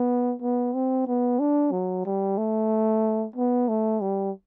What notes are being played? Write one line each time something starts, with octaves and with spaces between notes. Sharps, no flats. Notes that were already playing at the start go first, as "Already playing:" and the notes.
Already playing: B3
B3
C4
B3
D4
F#3
G3
A3
B3
A3
G3